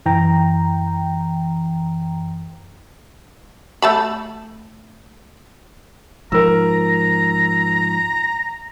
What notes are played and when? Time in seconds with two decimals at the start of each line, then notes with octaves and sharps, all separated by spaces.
0.06 F#2 E3 G5 A#5
3.82 A3 A5 B5
6.32 G#2 F3 A#4 A#5 E6